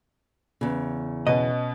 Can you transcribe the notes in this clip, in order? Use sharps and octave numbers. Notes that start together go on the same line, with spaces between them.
E2 C#3
B2 B3 C#4 D#5